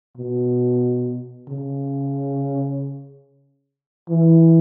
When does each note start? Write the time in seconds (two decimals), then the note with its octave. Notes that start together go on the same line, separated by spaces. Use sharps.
0.17 B2
1.49 C#3
4.10 E3